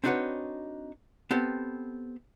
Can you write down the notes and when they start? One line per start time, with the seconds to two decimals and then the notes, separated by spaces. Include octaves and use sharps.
0.04 C4 D4 D#4 F#4 B4 C#5
1.31 B3 C4 G4 A4